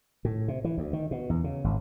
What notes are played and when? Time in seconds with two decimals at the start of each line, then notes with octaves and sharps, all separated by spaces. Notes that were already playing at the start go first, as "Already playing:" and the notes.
0.25 A2
0.48 C3
0.64 E3
0.78 D2
0.93 D#3
1.11 B2
1.30 E2
1.44 C#3
1.64 G#1